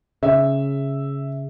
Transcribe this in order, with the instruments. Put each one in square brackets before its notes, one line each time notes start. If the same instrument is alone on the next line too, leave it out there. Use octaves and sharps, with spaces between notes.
[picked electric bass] C#3 [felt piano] E5